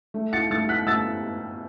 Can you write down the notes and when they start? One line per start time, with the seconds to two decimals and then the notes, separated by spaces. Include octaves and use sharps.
0.14 A3
0.33 A6 C#7
0.50 A3 A6 C#7
0.69 F#6 B6
0.87 A3 E6 A6